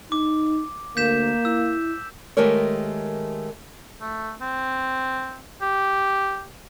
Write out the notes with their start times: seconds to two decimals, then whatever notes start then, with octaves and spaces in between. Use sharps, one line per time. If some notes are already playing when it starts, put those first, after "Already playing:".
0.12 D#4 D6
0.97 D2 A#3 G6 B6 E7
1.45 E4 E6
2.37 D#3 G#3 A3 G4 A#4 C#5
4.01 A3
4.41 C4
5.62 G4